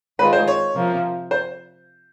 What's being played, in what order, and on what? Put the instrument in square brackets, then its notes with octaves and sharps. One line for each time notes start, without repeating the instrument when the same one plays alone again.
[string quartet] D#3 G#3 C4 F4 [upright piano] B4
[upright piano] C5
C#5
[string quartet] C3 F3 A#3
[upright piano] C5